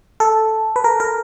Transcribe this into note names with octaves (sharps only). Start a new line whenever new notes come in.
A4
B4
A#4
A#4